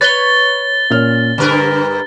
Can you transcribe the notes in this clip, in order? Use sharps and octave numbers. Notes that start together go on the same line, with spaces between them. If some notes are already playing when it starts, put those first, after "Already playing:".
B4 C#5 A6 G7
A#2 C#4 F6
G2 D3 A#4 B4